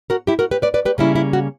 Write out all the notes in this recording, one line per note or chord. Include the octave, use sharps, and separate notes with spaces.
F#4 A#4
E4 G4
F#4 A#4
G4 B4
B4 D5
B4 D5
G4 B4
C#3 G3 A#3 C#4 E4
E4
F#4